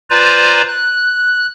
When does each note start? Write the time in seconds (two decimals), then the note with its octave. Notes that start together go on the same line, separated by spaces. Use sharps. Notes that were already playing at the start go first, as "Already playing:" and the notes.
0.10 F4 B4 C5 D5 G#5 A#5
0.68 F#6